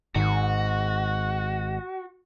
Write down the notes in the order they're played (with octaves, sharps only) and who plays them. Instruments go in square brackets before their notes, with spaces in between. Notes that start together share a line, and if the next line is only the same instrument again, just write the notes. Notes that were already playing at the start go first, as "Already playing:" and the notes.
[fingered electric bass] G#1 [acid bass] G#2 [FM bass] D#3 [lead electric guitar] F#4